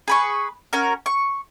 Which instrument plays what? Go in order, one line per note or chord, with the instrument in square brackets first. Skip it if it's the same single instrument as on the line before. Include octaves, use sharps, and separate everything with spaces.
[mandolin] G#4 B4 C#6
C#4 F#4 A#4
C#6